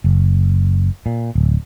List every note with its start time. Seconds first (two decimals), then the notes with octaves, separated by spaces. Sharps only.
0.04 F#1
1.06 A#2
1.35 D1